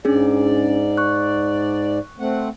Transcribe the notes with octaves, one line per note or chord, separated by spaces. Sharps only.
G#2 C#4 D4 G#4 D5
C#6 F#6
A3 C4 F#5